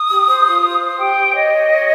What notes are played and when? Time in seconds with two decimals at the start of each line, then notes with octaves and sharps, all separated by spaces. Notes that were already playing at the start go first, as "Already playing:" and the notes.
Already playing: D#6
0.10 G4
0.27 C5
0.46 F4
0.63 C5
0.81 C5
0.98 G4 G5
1.16 G4
1.34 C#5 D#5
1.51 C#5
1.69 C#5